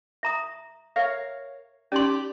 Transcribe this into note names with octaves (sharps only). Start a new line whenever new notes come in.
E5 A#5 D#6
A#4 C#5 E5 F5
C#4 D#4 G4 D5 C6